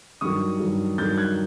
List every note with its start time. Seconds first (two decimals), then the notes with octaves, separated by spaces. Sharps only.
0.21 G2 D#3 F#3 C#6 D#6
0.60 G2 D#3 F#3
0.98 G2 D#3 F#3 G6 A6
1.18 F#6 G#6